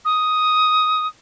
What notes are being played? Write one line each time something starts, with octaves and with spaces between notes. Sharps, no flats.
D#6